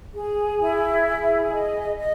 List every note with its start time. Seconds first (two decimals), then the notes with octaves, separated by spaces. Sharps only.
0.15 G#4
0.60 E4
1.06 G#4
1.51 D#5
1.97 D#5